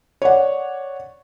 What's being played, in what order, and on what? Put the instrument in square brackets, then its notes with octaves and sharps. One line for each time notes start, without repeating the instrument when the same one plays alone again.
[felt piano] C#5 D5 F#5